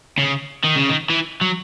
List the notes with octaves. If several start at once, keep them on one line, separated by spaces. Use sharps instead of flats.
C#3
D#3
C#3
D#3
E3
F#3